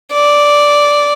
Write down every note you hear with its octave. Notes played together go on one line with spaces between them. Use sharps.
D5